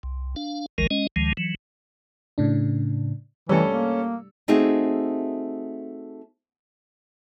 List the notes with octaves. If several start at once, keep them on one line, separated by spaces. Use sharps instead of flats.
C2
D4 F5
G#1 C#2 D#3 F3 G#3 A#4
G#3 C#4 D#5
D2 D#3 F3 G#3
E3 F#3
A2 C#3 D4
E3 G3 A3 C#4 A4
A#3
A3 C4 D#4 F#4 G#4